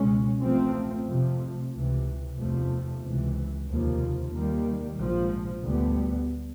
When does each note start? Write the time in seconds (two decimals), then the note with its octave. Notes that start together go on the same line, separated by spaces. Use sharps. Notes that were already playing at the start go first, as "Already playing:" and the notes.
Already playing: C#2 B2 G#3 C#4
0.41 A1 A2 F3 A3 C4
1.06 F2 C3 F3 A3
1.72 C#2 C3 E3
2.36 F1 E2 C3 F3 A3
3.02 C#2 C3 E3
3.66 F1 D#2 C#3 F3 A#3
4.32 D#2 D#3 G3 A#3
4.98 A#1 G#2 F3
5.63 D2 D3 G3 B3